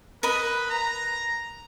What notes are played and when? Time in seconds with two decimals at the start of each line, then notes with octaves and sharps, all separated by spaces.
0.23 A#4 B4 D#5 B5
0.70 A#5